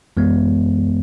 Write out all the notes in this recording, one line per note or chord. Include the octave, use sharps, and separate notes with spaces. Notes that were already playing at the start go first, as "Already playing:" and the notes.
F#2 E3 G#3 B3